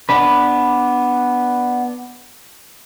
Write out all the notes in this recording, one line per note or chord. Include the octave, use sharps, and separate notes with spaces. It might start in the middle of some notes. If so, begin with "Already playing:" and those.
B3 D4 B4